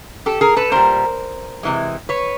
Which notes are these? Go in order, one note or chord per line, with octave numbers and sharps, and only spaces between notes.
G4 A4
G#4 A#4
A4 B4
A#2 G3 A#4 C5
C3 E3 G#3
B4 C#5